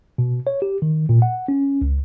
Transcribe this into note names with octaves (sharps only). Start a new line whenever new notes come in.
B2
C#5
G4
D#3
A#2
F#5
C#4
C#2